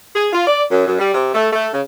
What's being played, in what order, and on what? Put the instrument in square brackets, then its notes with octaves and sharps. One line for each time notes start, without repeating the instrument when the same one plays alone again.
[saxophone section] G#4
F4
D5
F#2
F#2
G3
C3
A3
A3
C#3